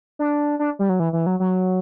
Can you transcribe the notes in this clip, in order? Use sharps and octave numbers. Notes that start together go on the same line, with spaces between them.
D4
D4
G3
F#3
E3
E3
F#3
F#3